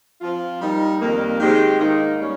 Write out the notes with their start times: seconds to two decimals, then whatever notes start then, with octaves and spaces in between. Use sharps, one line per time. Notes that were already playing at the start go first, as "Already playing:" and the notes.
0.21 F3 C4 F4
0.61 G3 A#3 D#4
1.00 F2 D#3 G3 A#3
1.40 D#3 G#3 C4 G4
1.79 G#2 D#3 A#3 D#4
2.20 G3 C#4